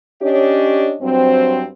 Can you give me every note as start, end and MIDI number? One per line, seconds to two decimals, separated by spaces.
0.22 0.96 61
0.22 0.96 62
0.22 0.96 67
0.22 0.96 73
0.22 0.96 75
1.02 1.65 43
1.02 1.65 54
1.02 1.65 60